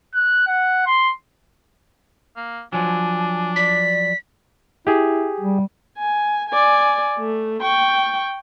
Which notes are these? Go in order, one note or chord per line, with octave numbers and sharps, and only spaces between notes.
F#6
F#5
C6
A#3
F3 F#3 D4 G#5
D5 B6
E4 G4 G#4
G3
G#5
D5 G#5
A3
G5 C#6